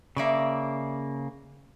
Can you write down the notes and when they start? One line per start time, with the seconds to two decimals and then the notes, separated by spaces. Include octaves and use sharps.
0.17 C#3 A#3 C#5 D5 E5